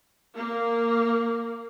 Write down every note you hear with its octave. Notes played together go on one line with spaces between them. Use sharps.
A#3